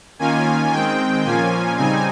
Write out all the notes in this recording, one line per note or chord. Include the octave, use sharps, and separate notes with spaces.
D#3 A#3 C#4 F4 G#5
D#3 G#3 C4 G5
A#2 F3 A#3 C#4 F4 G#5
C#3 G3 C4 D#4 G#5